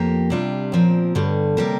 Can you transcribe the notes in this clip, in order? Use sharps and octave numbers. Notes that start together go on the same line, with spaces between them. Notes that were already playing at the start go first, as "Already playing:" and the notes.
Already playing: F2 F3 A#3 G4 A#4
C3 G3 D4 F4
A#2 F3 C4 A#4
G2 D3 G3
C3 G3 A#3 G4 A#4